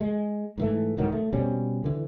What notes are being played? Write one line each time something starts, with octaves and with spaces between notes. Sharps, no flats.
G#3
G#2 E3 A3
C2 G#2 D#3 F#3
A3
B2 G3 C4 C#4
D3 E3